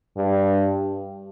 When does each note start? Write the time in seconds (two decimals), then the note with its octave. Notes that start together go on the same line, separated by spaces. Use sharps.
0.17 G2